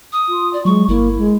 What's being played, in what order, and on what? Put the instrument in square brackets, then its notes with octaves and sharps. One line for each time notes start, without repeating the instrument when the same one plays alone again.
[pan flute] D#6
[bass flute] F4
[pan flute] D5
[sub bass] F#3 [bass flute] G#3 [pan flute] C#6
[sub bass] G1 [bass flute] A#3 [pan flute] E4
[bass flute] G#3